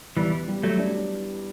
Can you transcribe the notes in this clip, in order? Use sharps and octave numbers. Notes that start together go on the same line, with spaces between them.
E2 E3 G3
G3
F#3 A3
D4